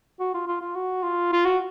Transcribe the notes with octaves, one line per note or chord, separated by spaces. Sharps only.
F#4
F4
F4
F4
F#4
F4
F4
F#4